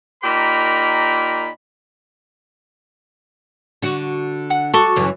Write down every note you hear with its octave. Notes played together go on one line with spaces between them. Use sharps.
A#2 D#4 G4 A#4 B5
D3 F#4
F#5
F#4 A4 C#6 D6
F#2 C#3 E3